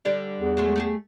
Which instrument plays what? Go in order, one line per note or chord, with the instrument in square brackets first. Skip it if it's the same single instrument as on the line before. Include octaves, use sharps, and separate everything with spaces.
[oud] D3 G3 D4
[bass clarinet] E2
[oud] F#3 G#3 A3
A3 G4 G#4